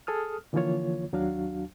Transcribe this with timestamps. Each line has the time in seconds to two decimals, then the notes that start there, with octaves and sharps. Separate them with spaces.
0.07 G#4 A4 D#6 F6
0.53 D3 E3 F3 A#3 F4 C#5
1.13 D#2 F#3 D4 F#4 F5